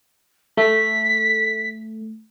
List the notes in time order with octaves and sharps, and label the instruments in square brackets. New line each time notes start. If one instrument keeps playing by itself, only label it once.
[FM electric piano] A3 [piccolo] B6